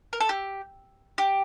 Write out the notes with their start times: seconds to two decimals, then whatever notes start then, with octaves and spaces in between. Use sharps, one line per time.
0.13 A#4
0.20 A4
0.29 G4
1.18 G4